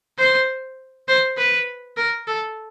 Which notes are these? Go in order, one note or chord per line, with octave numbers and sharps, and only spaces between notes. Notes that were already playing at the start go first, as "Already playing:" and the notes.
C5
C5
B4
A#4
A4